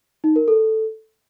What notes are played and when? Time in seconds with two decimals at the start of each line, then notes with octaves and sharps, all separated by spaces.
0.24 D#4
0.36 A#4
0.48 A4